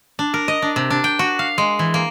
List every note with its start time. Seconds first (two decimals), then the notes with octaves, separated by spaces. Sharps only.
0.19 D4
0.34 A#4
0.48 D#5
0.62 D4
0.76 C3
0.90 D4
1.04 G5
1.19 F#4
1.39 F5
1.58 G#3
1.79 E3
1.94 A#3